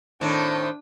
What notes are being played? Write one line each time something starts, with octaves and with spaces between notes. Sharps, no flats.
A2 D#3 C4 D4